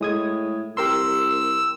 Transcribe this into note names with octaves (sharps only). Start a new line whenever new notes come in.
A2 G#3 D#6 G#6
C2 G4 A#4 C6 E6